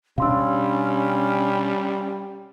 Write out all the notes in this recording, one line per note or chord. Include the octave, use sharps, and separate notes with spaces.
B2 G3 C#4 D4 F5 C6 E6